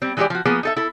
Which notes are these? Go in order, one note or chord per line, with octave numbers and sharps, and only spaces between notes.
G3 C4
E3 G#3 D#4 F#4 G4 D5
F3 F#4
F3 A#3 B3 G#4
D#4 A4 E5
E4 A4